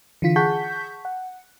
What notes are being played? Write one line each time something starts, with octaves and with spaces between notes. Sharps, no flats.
D3 E3 F4 B6
G#4 F#5 A5 C#6 G6 B6
F#5